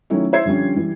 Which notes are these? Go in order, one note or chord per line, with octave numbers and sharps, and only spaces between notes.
D#3 F#3 A3 C#4 E4
E4 C5 E5 G#6 C7
D3 F3 G3 C#4 D4
E3 G3